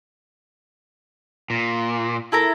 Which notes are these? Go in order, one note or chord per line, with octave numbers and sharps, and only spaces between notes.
A#2
E4 A4 A#4